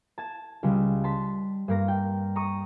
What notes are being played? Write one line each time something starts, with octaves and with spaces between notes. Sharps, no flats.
A5 G#6 E7
C#2 C#3 G3
A5 C6 B6
G2 A#3 A#6
G5
A#5 C#6 D#6